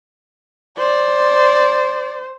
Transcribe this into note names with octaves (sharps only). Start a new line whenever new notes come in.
C5 D5